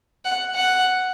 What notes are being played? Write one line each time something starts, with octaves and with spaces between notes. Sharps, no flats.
F#5
F#5